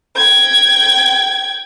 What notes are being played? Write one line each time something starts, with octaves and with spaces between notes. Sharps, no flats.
G5 G#6